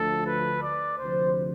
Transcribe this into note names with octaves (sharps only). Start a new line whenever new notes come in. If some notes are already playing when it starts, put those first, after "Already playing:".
Already playing: D2 D3 F3 A3 A4
B4
D5
D2 C3 F3 C5